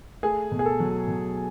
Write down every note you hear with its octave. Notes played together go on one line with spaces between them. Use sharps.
A3 G#4
B2
G#4
A4
F#3
B2